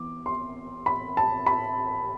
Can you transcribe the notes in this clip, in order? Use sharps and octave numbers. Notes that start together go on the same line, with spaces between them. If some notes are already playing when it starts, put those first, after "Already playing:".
Already playing: E3 B3 D6
C6
B5
A5
B5